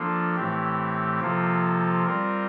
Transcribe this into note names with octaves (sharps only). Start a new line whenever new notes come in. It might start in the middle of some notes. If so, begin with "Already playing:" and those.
Already playing: F3 A#3 D4 F4 A4
A2 E3 A3 C4 G4
C3 F3 A#3 F4 A4
G3 C4 F4 A#4